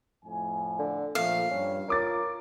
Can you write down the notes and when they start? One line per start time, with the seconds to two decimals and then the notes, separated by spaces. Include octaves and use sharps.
0.24 F2 A2 G#5
0.79 D3
1.15 A#2 F3 A3 F5
1.51 G2 C#4
1.88 F4 A#4 C#5 D6 A6